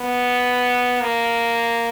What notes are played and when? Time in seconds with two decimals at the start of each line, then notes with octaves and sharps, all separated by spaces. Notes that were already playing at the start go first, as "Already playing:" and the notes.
Already playing: B3
1.01 A#3